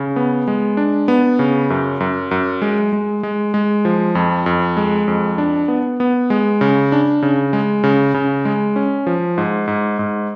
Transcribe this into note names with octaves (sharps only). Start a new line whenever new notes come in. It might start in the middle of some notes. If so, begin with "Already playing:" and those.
Already playing: C#3
B3
G#3
D4
B3
C#3
F#2
F#2
F#2
G#3
G#3
G#3
G#3
F3
F2
F2
G#3
F2
D4
B3
B3
G#3
C#3
D4
C#3
G#3
C#3
C#3
G#3
C#4
F3
G#2
G#2
G#2